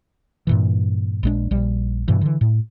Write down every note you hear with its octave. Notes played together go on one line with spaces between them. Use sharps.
G2 A#2 E3
A#1 G#3 D4
A#1 G3
G2 B2 E3
D3 E3
A2